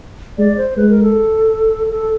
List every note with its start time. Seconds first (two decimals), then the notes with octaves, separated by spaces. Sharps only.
0.38 G#3 D5
0.57 C5
0.77 G#3 B4
0.89 A#4
1.03 A4
1.91 A4